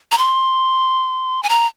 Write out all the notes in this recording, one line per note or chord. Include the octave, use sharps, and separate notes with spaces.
A#5
C6
G#5
A#5